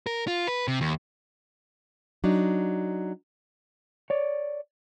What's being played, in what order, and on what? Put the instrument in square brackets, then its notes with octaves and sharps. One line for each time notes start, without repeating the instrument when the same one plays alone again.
[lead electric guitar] A#4
F4
B4
C3
D#2
[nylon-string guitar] F#3 D4 D#4
[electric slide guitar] C#5 D5